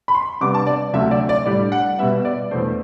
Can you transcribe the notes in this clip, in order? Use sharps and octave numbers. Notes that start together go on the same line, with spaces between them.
B5
C6
C3 G3 B3 D4 D6
A5
D5
D2 C3 F#3 A3 E5
D5
D5
A2 G3 D4 D5
F#5
B2 G3 B3 E5
D5
E2 B2 A3 C5